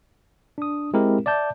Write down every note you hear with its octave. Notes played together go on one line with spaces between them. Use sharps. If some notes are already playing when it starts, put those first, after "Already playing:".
D4 D#6
G#3 C4 E4 G4 A#4
D5 E5 A5 G6